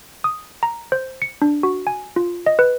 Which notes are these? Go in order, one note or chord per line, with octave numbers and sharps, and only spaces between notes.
D#6
A#5
C5
C#7
D4
F#4
G#5
F4
D#5
B4